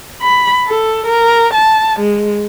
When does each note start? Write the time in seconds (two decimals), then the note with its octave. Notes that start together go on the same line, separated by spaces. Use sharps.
0.21 B5
0.66 A4
1.06 A#4
1.54 A5
2.00 G#3